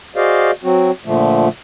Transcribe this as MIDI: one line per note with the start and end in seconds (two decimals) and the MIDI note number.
0.16 0.51 66
0.16 0.51 68
0.16 0.51 72
0.16 0.51 74
0.16 0.51 75
0.16 0.51 77
0.63 0.91 54
0.63 0.91 60
0.63 0.91 66
1.05 1.48 46
1.05 1.48 50
1.05 1.48 53
1.05 1.48 57